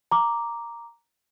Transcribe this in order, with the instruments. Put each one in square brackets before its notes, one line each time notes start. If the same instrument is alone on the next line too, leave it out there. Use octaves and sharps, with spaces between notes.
[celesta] A#5 D6